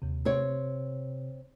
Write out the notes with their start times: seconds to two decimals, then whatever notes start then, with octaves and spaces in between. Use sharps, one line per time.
0.02 D#2 C3
0.25 C3 C4 C#5